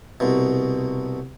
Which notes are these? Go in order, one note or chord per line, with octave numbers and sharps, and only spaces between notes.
C2 B2